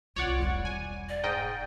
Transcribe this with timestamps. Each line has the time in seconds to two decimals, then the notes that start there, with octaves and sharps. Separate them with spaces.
0.16 C2 F4 C#5 D5 F#5
0.40 E1 G3
0.65 G#5
1.09 D5
1.23 G#2 D#5 G5